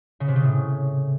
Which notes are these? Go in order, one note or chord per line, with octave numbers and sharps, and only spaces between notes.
C#3
C3
C#3
A2